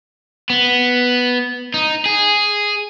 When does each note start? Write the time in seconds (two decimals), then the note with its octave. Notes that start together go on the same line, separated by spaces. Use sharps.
0.50 B3
1.74 D#4
2.06 G#4